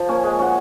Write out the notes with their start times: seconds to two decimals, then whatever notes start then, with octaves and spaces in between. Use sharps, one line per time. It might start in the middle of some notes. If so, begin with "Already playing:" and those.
Already playing: F3
0.08 A#3 C#4
0.23 G#3
0.39 C#4 F#4